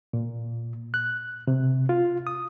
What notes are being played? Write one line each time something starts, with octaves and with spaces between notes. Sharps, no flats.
A#2
F#6
C3
F4
D#6